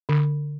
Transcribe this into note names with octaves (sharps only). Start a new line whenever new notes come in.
D3